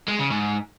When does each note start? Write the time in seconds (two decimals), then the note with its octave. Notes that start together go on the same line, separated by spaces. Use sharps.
0.08 G#3
0.19 C#3
0.30 G#2